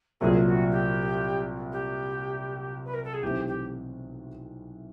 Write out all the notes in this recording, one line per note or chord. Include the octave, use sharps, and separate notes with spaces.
C2 A#2 F#3 A3 G#4
F#4
G4
G4
B4
A#4
A4
G#4
B1 A2 E3 A3 C4 G4
G4